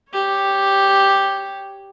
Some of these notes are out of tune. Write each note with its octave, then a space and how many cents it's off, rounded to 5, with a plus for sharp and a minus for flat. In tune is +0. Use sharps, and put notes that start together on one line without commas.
G4 +0 C#5 +0